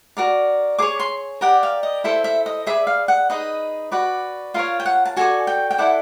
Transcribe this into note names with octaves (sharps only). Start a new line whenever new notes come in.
F#4 A#4 D5
G#4 C#5 D6
C6
G4 A#4 D5 F#5
F5
D#5
E4 A4 C5 E5
E5
D#5
G#4 B4 D5 E5
F5
F#5
D#4 G#4 B4 D#5
F#4 B4 D5
F4 A#4 C#5 F5
G5
F#5
A5
F#4 A4 D5 G#5
G5
G5
E4 A4 D5 F#5